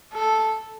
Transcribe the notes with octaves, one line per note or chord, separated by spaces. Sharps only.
A4